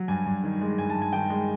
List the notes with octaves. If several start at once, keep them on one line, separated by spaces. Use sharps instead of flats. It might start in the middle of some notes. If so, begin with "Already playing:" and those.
Already playing: F#3
G2 G#5
G2
D#3
G#3
G2 G#5
A5
G2
G#5
D#3 G5
G#3